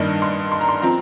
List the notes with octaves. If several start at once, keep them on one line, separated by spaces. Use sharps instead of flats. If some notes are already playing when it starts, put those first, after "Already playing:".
Already playing: G2 D#3 A#3 D4 D#5
C6
C6
A#5
C6
F3 C4 A#5